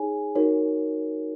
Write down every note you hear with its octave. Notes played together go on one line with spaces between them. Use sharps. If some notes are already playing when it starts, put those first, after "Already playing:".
Already playing: D#4 G#4 C#5 G#5
D#4 F#4 A#4 C#5